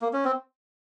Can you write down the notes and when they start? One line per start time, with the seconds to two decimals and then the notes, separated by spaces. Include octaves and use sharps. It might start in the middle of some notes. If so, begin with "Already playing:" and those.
0.01 A#3
0.13 C#4
0.25 C4